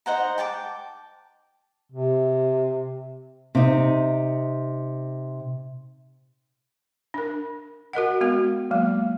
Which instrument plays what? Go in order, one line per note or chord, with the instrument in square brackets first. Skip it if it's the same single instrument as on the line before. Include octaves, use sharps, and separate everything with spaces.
[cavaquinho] D#4 C5 F#5 A#5
G5 A5 B5 D6
[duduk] C3
[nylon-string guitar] C3 D#4
[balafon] D4 A#4
F#4 A#4 D#5 F#5
G#3 B3 F#4
F#3 G#3 A#3